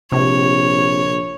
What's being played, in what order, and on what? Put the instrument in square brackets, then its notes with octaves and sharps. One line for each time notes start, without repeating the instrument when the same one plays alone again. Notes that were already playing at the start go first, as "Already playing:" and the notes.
[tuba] A#1 [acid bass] C3 [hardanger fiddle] C#5